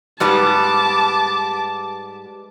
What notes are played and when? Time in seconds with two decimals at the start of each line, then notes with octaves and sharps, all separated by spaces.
0.20 G#2 G3 B3 A5 D6